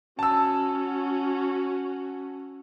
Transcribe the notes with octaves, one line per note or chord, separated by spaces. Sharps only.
C#4 F#4 A5 E6